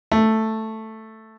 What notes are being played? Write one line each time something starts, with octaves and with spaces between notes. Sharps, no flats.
A3